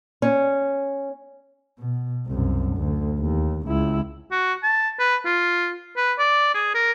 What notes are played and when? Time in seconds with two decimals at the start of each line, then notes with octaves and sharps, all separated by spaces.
0.22 C#4
1.79 B2
2.27 C2 F#2
2.76 D2
3.19 D#2
3.67 C#2 E4
4.32 F#4
4.63 A5
5.00 B4
5.26 F4
5.97 B4
6.19 D5
6.54 G#4
6.75 A#4